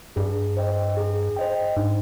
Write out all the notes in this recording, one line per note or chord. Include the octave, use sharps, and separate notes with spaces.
G2 G#4
C5 D#5 G5
G#4
C5 D#5 G5
G#2 D4